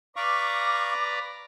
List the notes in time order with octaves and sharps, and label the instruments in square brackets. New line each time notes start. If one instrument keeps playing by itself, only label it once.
[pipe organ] B4 D5 A#5 [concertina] F5 C#6 [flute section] D6